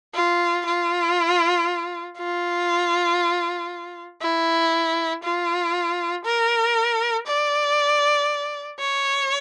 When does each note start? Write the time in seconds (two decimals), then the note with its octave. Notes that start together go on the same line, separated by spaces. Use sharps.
0.14 F4
0.66 F4
2.18 F4
4.21 E4
5.23 F4
6.24 A#4
7.27 D5
8.79 C#5